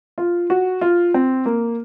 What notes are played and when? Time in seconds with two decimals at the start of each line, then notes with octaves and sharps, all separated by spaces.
0.18 F4
0.50 F#4
0.81 F4
1.14 C4
1.46 A#3